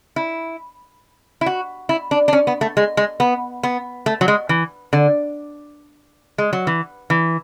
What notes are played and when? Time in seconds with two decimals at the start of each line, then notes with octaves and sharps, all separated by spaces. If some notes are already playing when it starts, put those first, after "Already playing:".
0.16 E4
1.41 E4
1.46 F#4
1.89 E4
2.11 D4
2.28 D4
2.33 C#4
2.47 B3
2.61 A3
2.77 G#3
2.97 G#3
3.20 B3
3.63 B3
4.06 A3
4.21 F#3
4.28 G#3
4.49 E3
4.93 D3
6.38 G#3
6.53 F#3
6.67 E3
7.10 E3